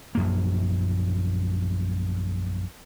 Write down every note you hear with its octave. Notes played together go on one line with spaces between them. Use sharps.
A#1 F#2 A#3